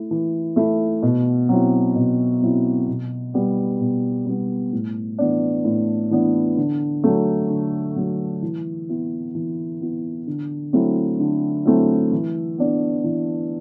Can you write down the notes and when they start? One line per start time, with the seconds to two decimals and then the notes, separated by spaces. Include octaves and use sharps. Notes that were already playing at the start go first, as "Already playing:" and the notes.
Already playing: A3 E4
0.11 E3
0.56 A3 E4
1.02 B2
1.49 F#3 C4 E4
1.95 B2
2.42 F#3 C4 E4
2.88 B2
3.34 G3 B3
3.80 B2
4.26 G3 B3
4.72 A2
5.19 E3 B3 D4
5.65 A2
6.11 E3 B3 D4
6.57 D3
7.04 F#3 A3
7.50 D3
7.96 F#3 A3
8.42 E3
8.89 B3 E4
9.35 E3
9.81 B3 E4
10.27 D3
10.73 F#3 A3 C4 E4
11.19 D3
11.65 F#3 A3 C4 E4
12.12 E3
12.58 B3 D4
13.04 E3